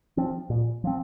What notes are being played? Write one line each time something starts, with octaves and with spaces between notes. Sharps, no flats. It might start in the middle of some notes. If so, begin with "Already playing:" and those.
F3 C4
A#2
F3 C4